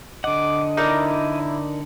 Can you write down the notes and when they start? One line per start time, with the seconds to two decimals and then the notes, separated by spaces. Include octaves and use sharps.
0.24 D3 D#5 F#5 D6
0.77 D#4 E4 A#4 D5